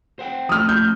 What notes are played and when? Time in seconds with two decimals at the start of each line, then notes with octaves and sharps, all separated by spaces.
0.19 C5 F#5 G5
0.49 F3 A3 C#4 D#6 F6
0.69 G6